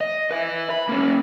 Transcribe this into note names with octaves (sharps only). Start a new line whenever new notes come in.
D#5
B4 E5
B5
A#3 C#4